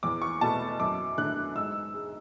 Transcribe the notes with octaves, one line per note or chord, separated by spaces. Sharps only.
E2 D6
C#6
B2 A3 A5
F#2 D6
D3 A3 F#6
G#2 E6
G#3